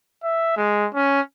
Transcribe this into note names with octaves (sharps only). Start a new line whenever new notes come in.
E5
G#3
C#4